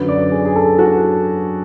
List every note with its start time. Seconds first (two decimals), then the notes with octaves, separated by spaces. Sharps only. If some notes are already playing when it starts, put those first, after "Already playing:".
Already playing: F#2 D3 F#3 B4
0.08 D5
0.32 G#4
0.45 G#4
0.56 A4
0.79 F#4